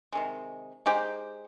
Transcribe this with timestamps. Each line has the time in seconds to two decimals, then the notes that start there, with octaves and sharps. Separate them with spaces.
0.12 C3 D#3 G#3
0.86 G#3 D#4 G4 C5